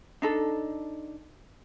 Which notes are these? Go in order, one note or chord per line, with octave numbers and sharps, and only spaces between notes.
D4 D#4 A4